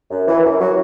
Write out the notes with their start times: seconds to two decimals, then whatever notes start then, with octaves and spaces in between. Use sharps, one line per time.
0.11 F#2
0.27 E3
0.44 F#2
0.61 F#3